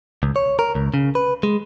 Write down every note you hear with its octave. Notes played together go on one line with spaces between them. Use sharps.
C#2
C#5
A#4
C#2
C#3
B4
G#3